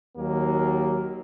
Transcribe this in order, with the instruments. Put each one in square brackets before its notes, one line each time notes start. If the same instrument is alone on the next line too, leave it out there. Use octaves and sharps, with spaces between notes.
[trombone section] D#2 F#3 A#3 D#4